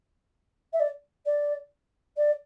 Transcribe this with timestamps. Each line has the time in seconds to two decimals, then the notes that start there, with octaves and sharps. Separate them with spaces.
0.73 E5
0.80 D5
1.25 D5
2.17 D5